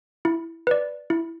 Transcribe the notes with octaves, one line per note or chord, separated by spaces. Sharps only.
E4
B4 D5
E4